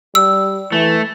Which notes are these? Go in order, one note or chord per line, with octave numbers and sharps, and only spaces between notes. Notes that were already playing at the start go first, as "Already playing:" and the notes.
G3 E6
E3 A3